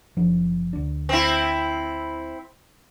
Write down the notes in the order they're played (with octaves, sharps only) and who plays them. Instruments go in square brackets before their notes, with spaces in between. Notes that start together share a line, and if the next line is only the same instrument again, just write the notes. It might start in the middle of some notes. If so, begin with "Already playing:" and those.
[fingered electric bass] F#1 F3 D4
D2 D4
[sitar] C4 E4